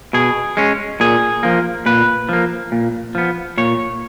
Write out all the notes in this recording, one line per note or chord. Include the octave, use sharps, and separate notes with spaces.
B2 G#4
G#3 C#4
A#2 G#4
F3 A#3
A#2 B4
F3 A#3
A#2
F3 B3
A#2 C#5